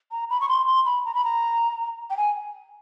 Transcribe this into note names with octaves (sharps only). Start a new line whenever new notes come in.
A#5
B5
C#6
C6
C6
B5
A#5
B5
A#5
G5
G#5